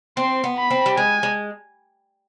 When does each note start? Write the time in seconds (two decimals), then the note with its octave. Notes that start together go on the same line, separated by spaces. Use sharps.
0.17 C4 C6
0.44 B3
0.57 B5
0.71 C4
0.86 G3
0.97 G#3 G#5
1.23 G#3